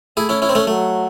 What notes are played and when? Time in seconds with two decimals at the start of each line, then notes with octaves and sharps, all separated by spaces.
0.17 A3 E4 G#4
0.29 C#4 E4
0.42 C#4 E4
0.49 C4
0.55 A3 C#4
0.67 F#3 A3